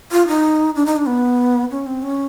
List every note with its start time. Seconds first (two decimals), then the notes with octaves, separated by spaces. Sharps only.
0.12 F4
0.28 D#4
0.76 D4
0.86 D#4
0.97 D4
1.07 B3
1.71 C#4
1.87 C4
2.03 C#4